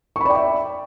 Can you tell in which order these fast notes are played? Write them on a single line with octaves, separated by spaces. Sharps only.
C#6 B5 D5 G5 E5